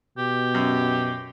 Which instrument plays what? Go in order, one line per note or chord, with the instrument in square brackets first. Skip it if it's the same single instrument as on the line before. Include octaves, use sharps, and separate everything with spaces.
[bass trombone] B2 [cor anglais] G4
[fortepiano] F#2